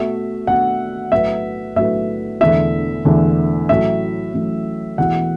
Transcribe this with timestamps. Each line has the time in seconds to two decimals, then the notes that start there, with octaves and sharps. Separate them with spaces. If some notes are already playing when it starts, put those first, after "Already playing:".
Already playing: B2 A3 F#4 E5
0.47 B2 A3 F#4 F#5
1.12 B1 A2 A3 F#4 B4 E5
1.76 B1 A2 A3 F#4 B4 E5
2.41 E1 E2 D3 A3 E4 E5
3.05 E1 E2 D3 A3 E4
3.69 A1 A2 F#3 A3 E5
4.34 A1 A2 F#3 A3
4.98 E1 E2 E3 A3 F#4 F#5